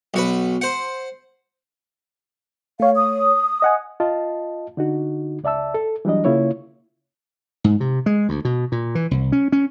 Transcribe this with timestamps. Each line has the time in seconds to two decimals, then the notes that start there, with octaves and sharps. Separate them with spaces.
0.14 B1 F#4 B4
0.61 C5 F#5
2.80 A3 C#5 F5
2.96 D#6
3.62 D#5 F#5 G#5
4.00 F4 D#5 A5
4.77 D3 D#4 F#4
5.44 C#2 D5 E5 A5 E6
5.74 A4
6.05 E3 F#3 G3 D4 D#5
6.25 C#3 A#3 E4 F4 C#5
7.64 G#2
7.80 C3
8.06 G#3
8.29 D2
8.45 B2
8.72 A#2
8.95 E3
9.11 C2
9.32 C#4
9.52 C#4